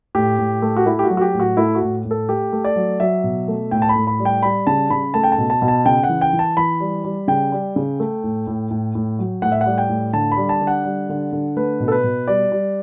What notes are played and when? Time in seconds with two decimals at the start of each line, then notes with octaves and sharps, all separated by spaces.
0.15 A2 G4
0.38 A2
0.62 A3
0.77 F#4
0.86 A3 E4
0.99 G4
1.04 F#4
1.10 F#3
1.17 F#4
1.21 G4
1.34 A2
1.40 F#4
1.57 A3 E4
1.75 F#4
1.82 A2
2.05 A2
2.11 A4
2.29 A3 G4
2.53 A3
2.65 D5
2.76 F#3
3.00 F#3 E5
3.24 B2
3.48 A3
3.71 A2 G5
3.82 A5
3.89 B5
3.95 A2
4.07 B5
4.19 G3
4.25 G5
4.42 G3 B5
4.67 C#3 A5
4.90 C#3 B5
5.14 A3 A5
5.23 G5
5.32 A5
5.38 B2
5.50 A5
5.62 B2
5.68 A5
5.85 C#3 G5
6.04 F#5
6.09 E3
6.21 G5
6.33 E3
6.39 A5
6.57 E3 B5
6.80 G3
7.04 G3
7.28 C#3 G5
7.52 G3
7.76 C#3
8.00 A3
8.24 A2
8.47 A2
8.71 A2
8.95 A2
9.19 F#3
9.42 A2 F#5
9.52 E5
9.61 F#5
9.66 G3
9.78 G5
9.89 A2
10.13 D3 A5
10.32 B5
10.37 G3
10.49 A5
10.61 D3
10.67 F#5
10.85 G3
11.09 D3
11.32 D3
11.56 A3 B4
11.80 B2
11.88 A4
11.92 B4
12.04 B2
12.28 G3 D5
12.52 G3